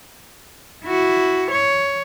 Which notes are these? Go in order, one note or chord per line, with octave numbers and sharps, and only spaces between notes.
E4 F#4
C#5